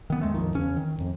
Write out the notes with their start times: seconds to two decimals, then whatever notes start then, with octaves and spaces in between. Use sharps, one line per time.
0.10 D#3 B3
0.21 E2 G#3 A3
0.34 A#1 F2 D#3
0.54 E2 C#3 C#4
0.76 D#3
0.96 D1 F2